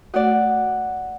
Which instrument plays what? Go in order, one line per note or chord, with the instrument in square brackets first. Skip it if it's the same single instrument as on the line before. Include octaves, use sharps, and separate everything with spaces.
[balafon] A3 F#4 [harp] D5 F#5